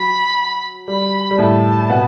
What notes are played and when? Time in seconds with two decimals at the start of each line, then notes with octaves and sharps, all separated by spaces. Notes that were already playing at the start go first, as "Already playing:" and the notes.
Already playing: F#3 B5
0.88 G3 B5
1.31 G3
1.38 A2 A3 A5
1.90 B2 B3